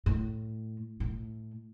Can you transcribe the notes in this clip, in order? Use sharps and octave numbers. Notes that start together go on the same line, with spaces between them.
A2
A2